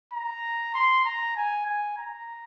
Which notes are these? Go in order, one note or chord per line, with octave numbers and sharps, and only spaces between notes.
A#5
C6
A#5
G#5
G#5
A#5